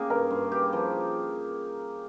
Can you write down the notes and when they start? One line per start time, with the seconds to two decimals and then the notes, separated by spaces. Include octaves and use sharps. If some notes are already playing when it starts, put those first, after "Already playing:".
Already playing: A#3 C#4 G4 G#4
0.10 G2 A#4
0.30 G2
0.52 G4
0.73 F3